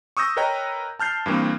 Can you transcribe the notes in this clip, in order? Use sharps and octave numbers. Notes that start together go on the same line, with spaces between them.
C#6 D#6 E6 G6 A#6
A#4 B4 C#5 D#5 G5 A#5
A5 F6 G6 C7
G2 E3 A#3 C4